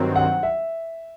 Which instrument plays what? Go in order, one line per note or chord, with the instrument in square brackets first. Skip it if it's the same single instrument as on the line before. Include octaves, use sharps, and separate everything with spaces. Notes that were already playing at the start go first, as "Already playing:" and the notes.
Already playing: [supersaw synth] G2 D#3 F#3 C4
[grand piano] F#5
E5